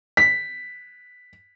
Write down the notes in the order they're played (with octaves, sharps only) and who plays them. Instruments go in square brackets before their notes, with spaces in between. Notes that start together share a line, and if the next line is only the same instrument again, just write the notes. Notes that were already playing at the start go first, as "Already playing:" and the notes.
[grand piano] B6